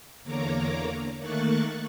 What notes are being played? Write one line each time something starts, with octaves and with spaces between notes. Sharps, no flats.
E2 D3 A#3 C#5 A#5 D6
D#3 A3 A#3 C#6 F#6 A6